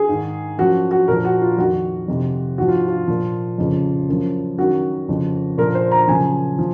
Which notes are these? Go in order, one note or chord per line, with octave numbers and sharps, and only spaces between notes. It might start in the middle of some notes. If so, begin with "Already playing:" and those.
Already playing: G#4
G#2 D#3
F#2 F3 F#4
F#4
A#2 F3 A#4
F#4
F4
F2 D#3 F#4
F2 C3 D#3
G#2 F3 F#4
F4
F4
A#2 F3
F2 C#3 F3
F#2 F3
F#2 D#3 F#4
F2 C#3 F3
A#2 F3 A#4
C5
A#5
F#2 C#3 F3 G#5
F3